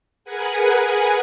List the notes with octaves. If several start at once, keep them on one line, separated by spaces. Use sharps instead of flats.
G#4 A#4 B4 F#5 G#5